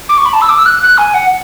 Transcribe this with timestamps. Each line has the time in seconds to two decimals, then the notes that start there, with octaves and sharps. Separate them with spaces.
0.09 D6
0.18 C#6
0.26 B5
0.33 A5
0.41 E6
0.49 D6
0.58 E6
0.66 F#6
0.82 F#6
0.98 G#5
1.14 F#5